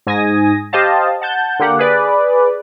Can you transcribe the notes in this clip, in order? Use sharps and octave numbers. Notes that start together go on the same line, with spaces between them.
G#2 G#5 D#6 A#6
G4 C5 D#5 F5 A5
F#5 A5 G6
D3 A#3 G4 F#5
G#4 B4 D5